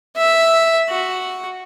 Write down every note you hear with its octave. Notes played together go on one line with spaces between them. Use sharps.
E5
F#4